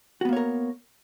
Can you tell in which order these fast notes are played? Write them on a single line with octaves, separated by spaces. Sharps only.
F#4 B3 A#3 C#5 A#4